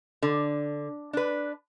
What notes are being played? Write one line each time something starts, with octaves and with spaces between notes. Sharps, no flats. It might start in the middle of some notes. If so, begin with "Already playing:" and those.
D3
D4 B4